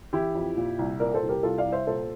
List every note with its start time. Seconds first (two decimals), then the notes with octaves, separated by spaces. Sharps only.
0.13 E3 E4 G4
0.35 F2
0.57 A#2
0.79 C2
0.99 A#2 A#4 D5
1.14 A4 C5
1.22 C2
1.29 G4 A#4
1.43 C2 F4 A4
1.58 D5 F5
1.65 C2
1.72 C5 E5
1.87 A#2 A4 C5